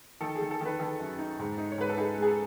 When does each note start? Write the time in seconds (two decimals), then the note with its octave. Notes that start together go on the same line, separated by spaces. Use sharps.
0.21 D#3 A4
0.35 G#4
0.41 D#3
0.51 A4
0.61 D#3 B4
0.79 D#3 A4
0.99 F#2
1.19 D#4
1.39 G#2
1.58 D#4
1.72 C#5
1.78 G#2 B4
1.89 A4
1.97 D#4 G#4
2.18 G#3 G#4
2.27 A4